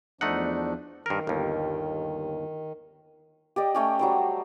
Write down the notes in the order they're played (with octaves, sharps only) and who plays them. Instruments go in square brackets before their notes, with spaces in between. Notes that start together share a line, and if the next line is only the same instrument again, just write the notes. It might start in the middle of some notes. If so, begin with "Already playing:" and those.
[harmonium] E2 F3 D4 [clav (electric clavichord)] A3 D#4 F#5
[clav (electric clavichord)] G2 A#4 [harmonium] D#3
[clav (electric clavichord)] G1 D#2
[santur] G4 D5 D#5
A3 C#4 G4
F#3 G3 C5